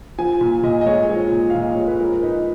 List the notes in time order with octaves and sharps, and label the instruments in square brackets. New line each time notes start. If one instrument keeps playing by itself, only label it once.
[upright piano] F3 G#5
A#2
A#2 D#5
D#5
G#3 C#5
F3
A#2
A#2 F5
D#5
G#3 C#5
B4
F3 A#4
D#4 B4